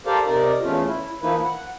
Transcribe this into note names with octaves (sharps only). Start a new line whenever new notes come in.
G4 A4 A#4 C5 D5 F5
C3 D#4 A#4 D5
E2 A2 C#3 A3 F4
E4
E3 F3 A#3 D#4 E4 B4
F#5